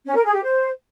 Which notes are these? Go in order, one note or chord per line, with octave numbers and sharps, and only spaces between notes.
C#4
A#4
G#4
G4
C5